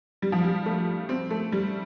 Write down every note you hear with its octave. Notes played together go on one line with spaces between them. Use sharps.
G3
F3
G3
A3
C4
A3
G3